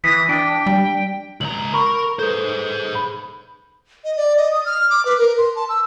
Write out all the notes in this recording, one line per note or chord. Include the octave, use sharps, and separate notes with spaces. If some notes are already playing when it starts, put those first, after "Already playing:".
E3 D#6 A#6 B6
D4 G5
G3
C#2 A#5 F#7
A#4 B5 C#6
G#4 A4 B4 C5
B5
D#5
D5
D#5
D#6
F6
D6
B4
A#4
C6
A5
E6